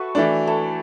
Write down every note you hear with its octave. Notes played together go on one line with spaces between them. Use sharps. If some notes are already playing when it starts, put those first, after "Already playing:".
Already playing: F#4 A4 B4 E5
E3 A3 D4
E4 A4